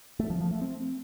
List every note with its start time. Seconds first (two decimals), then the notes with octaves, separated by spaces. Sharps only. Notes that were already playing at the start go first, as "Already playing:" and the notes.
0.20 A3
0.30 F3
0.41 F3
0.51 A3
0.62 C4